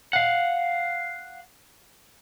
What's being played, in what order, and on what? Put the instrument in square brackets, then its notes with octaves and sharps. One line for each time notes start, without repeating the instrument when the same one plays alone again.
[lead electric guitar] F5 F#5